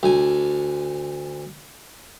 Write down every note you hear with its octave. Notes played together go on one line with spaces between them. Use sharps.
D2 G#5